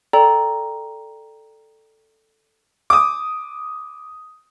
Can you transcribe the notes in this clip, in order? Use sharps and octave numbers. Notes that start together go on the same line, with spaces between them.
A4 D5 G5 A#5
D6 D#6